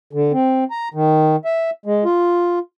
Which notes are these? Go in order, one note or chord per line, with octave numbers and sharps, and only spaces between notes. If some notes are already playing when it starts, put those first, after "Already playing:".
D3
C4
A#5
D#3
E5
G#3
F4